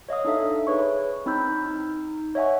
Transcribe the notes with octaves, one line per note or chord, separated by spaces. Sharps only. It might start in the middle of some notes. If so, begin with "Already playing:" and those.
C#5 D#5 F5 D#6
D4 D#4 A4 E5
G#4 B4 C#5 C#6
C4 D#4 B5 E6 G6
D#4
C#5 D#5 E5 F#5 G#5 C#6